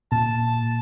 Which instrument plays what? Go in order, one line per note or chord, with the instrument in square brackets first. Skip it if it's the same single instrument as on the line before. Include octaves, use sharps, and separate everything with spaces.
[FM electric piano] A#2 [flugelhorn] A5